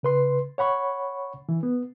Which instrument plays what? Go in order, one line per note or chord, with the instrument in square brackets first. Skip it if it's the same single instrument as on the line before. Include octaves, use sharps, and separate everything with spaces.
[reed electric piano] C#3 B4 C6
C#5 F#5 B5 C#6
E3
B3